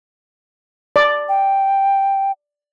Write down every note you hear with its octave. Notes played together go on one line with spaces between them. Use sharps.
D5
G5